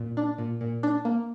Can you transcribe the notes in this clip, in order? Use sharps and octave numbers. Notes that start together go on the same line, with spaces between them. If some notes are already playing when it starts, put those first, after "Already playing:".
Already playing: A#2
D4
A#2
A#2
D4
A#3